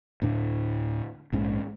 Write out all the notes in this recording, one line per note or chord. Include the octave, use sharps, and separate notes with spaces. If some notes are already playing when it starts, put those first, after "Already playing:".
D2 A2 D4
A#1 G#2 C#4